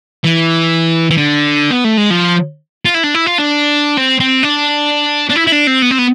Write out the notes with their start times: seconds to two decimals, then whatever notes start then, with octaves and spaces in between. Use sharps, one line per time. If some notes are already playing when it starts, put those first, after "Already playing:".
0.24 E3
1.10 E3
1.17 D3
1.70 B3
1.84 A3
1.97 G#3
2.10 F3
2.85 F4
2.94 E4
3.04 D4
3.15 E4
3.26 F4
3.38 D4
3.97 C4
4.20 C4
4.43 D4
5.29 D4
5.36 E4
5.47 E4
5.52 D4
5.67 C4
5.82 B3
5.91 C4
5.99 B3